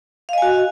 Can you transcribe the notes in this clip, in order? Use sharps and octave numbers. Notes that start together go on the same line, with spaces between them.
F#4 D#5 F5 G#5